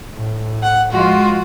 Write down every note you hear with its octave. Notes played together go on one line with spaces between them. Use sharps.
A2
F#5
F3 G#3 F4 F#4